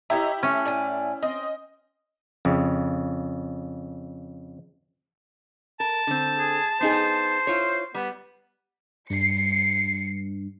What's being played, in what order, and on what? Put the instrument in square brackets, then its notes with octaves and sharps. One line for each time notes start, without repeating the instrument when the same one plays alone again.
[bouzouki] D#4 C#5 A#5 [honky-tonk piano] E4 G4 E5
[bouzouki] A3 [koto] C#4
[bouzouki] A2 D5 G#5
[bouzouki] C4 [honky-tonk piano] D#5
[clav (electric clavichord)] F2 C#3
[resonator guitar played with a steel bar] A#4 [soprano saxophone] A5
[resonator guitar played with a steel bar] D3 C4
[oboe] G#4
[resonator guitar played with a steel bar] B3 D#4 G#4 [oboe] C5
[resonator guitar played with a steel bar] E4 F4 C#5
[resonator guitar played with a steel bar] G3 [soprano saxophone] B3
[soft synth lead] G2 [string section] C7 C#7